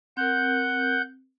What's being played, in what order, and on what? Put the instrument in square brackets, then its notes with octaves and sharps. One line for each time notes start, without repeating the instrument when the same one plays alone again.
[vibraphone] C4 A#4 [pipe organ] F#5 G6